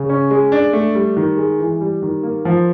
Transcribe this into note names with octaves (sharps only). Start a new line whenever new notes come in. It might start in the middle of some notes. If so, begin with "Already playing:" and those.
Already playing: C#3
C#4
G#3
D4
A3
G3
D#3
G#3
E3
G3
D#3
A#3
F3